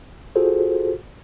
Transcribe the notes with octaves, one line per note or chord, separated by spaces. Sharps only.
F4 F#4 G#4 A4 C5